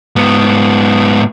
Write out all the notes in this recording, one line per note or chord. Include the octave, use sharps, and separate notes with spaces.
G#2 B3